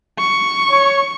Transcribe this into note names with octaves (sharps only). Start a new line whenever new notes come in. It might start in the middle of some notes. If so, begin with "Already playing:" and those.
C#6
C#5